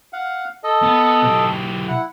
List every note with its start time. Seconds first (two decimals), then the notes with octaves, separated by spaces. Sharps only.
0.13 F5 F#5
0.64 A4 D#5
0.83 B3
1.22 B1 G4
1.88 E4 F#5